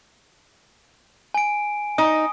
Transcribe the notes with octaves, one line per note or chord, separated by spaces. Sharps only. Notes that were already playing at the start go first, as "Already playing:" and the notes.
G#5 D7
D#4 D#6